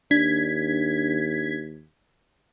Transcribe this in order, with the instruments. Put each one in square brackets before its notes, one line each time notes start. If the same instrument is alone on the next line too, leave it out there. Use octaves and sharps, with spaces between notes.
[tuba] D#2 [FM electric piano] D4 [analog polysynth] G#6 B6